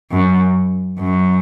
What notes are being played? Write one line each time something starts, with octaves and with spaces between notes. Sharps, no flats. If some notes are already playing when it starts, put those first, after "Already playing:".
F#2
F#2